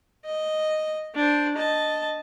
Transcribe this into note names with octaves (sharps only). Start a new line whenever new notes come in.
D#5
D4 C5
D#5 A5